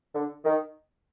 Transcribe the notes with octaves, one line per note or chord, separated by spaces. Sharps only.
D3
D#3